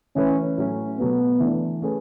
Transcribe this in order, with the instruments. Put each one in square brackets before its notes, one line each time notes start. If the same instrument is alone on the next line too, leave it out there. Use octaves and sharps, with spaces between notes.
[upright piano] E3 A3 E4 B4 [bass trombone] C#4
[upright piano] A2 F#3 C#4 F#4
[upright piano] B2 F#3 A3 [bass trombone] B3
[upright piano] E3 A3 D4
A3 C#4 G#4 B4